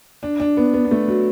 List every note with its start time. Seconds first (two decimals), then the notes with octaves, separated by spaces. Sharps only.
0.23 D4
0.40 D4
0.57 B3
0.74 B3
0.85 B3
0.91 A3
1.08 F#3